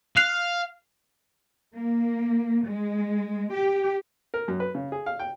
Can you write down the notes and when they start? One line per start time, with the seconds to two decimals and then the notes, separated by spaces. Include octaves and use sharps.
0.17 F5 F#6 C7 F7
1.76 A#3
2.67 G#3
3.52 G4
4.34 A#4
4.48 F#2
4.60 B4
4.75 C#3
4.92 G#4
5.06 F5
5.20 G5